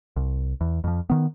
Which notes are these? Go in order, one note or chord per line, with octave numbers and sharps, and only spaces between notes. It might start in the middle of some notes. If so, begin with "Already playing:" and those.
C2
E2
F2 F3
D#3 B3